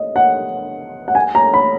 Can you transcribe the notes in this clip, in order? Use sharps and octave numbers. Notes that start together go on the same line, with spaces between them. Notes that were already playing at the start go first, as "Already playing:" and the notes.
Already playing: D#5
F#5
F#5
G#5
A#5
B5